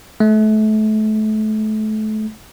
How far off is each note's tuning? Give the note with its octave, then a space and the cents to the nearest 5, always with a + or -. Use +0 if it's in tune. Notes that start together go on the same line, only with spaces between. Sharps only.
A3 -30